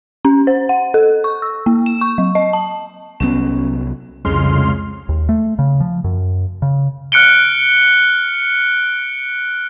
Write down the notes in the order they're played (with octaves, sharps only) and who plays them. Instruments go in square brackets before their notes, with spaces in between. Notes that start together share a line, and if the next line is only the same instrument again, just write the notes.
[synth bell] C#4
C5
F#5
A4
C#6
E6
A#3
E7
C#6
F#3
D#5
A5
[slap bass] C2 F#3 B3 [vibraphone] C#4
[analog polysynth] C2 F2 C#3 G#3 C6 F6
[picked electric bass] D#2
A3
C#3
F3
F#2
C#3
[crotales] F6 F#6 C#7 D7 G7